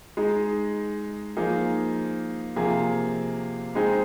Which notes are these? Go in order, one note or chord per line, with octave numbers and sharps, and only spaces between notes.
G#3 D#4 G#4
F3 A#3 D#4 G#4
C3 F3 A#3 G#4
G#3 C4 D#4 G#4